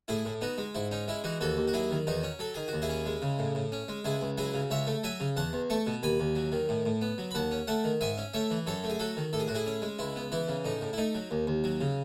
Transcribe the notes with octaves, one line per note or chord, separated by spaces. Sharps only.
A2 E4 G#4
A2
B3 D#4 F#4
G#3
G#2 E4
C#4 D#4
G#3 E4
E3 D#4 F#4
D#2 F#4 A4
D#2
F#4
F#3 E4 G#4
D#3
E2 D#4 F#4
C#4
F#3 A4
D#3 G#4
F#4
D#2
E4 G#4
C#4
G#3
C#3
A2
A2
C#4
G#3
C#2 E4 G#4
C#2
F#3 E4 G#4
C#3
C#2 C#5 E5
A3
F#3 E5 G#5
C#3
E2 F#5 A5
E2
A3 A5 C#6
B2
D#2 G#5 B5
D#2
F#3
D#3
A2
A2
B3
F#3
B5
D#2 F#5 A5
C#4
A3 F#5 A5
D#3
G#2 E5 G#5
C#4
A3 C#5 E5
E3
F#2 A4 C#5
A3
G#4
F#3 F#4 A4
D#3
A2 A4
G#4
A2 F#4
E4 G#4
C#4
G#3
C#2 E4
B3
E3 E4
C#3
A2 D#4
A2
E4
A3 D#4
F#3
D#2
D#2
F#3
C#3